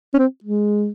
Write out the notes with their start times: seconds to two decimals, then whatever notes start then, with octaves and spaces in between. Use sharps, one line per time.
0.14 C#4
0.18 C4
0.44 G#3